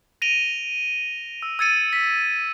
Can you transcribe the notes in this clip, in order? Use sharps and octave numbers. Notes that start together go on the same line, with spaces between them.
A#6 D7 D#7 F7 G7
E6
E6 G#6 A6 C#7 D#7
B6